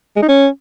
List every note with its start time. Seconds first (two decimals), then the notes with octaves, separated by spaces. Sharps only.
0.16 G#3
0.22 D#4
0.28 C#4